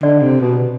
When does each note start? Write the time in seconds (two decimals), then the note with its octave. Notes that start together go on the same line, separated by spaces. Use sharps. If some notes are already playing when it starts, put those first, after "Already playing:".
0.03 D3 D5
0.22 C3
0.41 B2